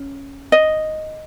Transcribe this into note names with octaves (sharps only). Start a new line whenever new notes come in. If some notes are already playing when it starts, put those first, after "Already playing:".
Already playing: C#4
D#5